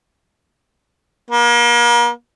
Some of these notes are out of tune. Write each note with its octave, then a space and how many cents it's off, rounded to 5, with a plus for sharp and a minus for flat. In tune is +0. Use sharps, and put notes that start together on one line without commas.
A#3 +40